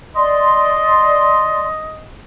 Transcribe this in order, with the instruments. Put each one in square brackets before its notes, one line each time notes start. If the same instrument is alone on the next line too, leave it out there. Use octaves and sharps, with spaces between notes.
[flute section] D5 C6 [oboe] D#5